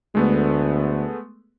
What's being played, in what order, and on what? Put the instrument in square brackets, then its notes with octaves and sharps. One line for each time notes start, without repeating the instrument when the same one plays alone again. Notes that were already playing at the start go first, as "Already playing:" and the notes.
[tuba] D2 [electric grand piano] G#3 A3 B3